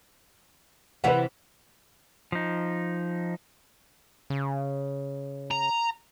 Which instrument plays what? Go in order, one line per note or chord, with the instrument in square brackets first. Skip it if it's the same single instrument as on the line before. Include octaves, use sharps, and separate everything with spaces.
[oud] C3 E3 E4 [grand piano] B4 F#5
[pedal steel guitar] F3 D#4
[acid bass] C#3
[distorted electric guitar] A#5